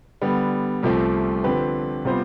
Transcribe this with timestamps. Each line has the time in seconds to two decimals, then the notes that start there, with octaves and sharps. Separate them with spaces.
0.22 D3 G3 B3
0.83 C2 C3 F3 A3 C4
1.44 D3 F3 C4 G4 B4
2.05 C3 G3 B3 F4 C5